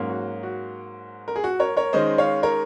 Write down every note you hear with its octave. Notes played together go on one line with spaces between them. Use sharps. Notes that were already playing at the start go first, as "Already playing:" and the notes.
Already playing: G#2 F#3 A#3 C#4
F#4
F#4
A#4
G#4
F#4
A#4 C#5
A#4 C#5
D#3 G#3 C#4 C5 D#5
C#5 F5
A#4 C#5